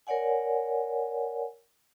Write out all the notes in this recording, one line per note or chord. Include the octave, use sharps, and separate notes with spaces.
A#4 C#5 D5 F#5 G#5